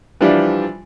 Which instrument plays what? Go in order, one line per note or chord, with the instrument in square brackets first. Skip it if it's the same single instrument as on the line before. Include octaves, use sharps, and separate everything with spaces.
[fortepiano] E3 F3 G3 D4 E4 F4